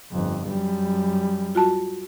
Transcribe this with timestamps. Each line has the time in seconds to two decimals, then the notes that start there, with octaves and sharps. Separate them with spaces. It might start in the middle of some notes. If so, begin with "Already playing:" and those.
0.12 G1 F2
0.48 F#2 G3
1.55 F4 F#4 A5